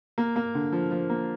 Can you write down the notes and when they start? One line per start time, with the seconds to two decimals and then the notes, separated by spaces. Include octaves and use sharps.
0.18 A#3
0.36 A#3
0.54 D3
0.72 F3
0.91 F3
1.10 A#3